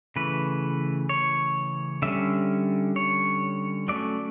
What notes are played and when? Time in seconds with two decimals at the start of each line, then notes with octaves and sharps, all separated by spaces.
0.16 C#3 E3 A3 B4
1.09 C#5
2.02 D3 G3 C#4 E5
2.96 C#5
3.88 F#3 A3 C#4 D5